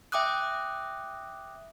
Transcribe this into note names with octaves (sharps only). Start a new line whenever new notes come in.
E5 G5 D6 D#6 F#6